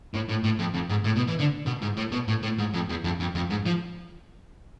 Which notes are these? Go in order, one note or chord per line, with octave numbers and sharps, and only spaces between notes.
A2
A2
A2
F2
F2
G#2
A2
B2
E3
D3
B2
G#2
A2
B2
A2
A2
G#2
F2
E2
F2
F2
F2
G#2
F3